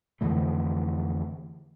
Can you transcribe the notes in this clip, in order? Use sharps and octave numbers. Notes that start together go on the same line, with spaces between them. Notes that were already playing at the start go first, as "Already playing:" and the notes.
F2 D3 E3 A3